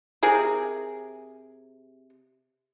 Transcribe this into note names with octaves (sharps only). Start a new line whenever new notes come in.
C3 G#4 A#4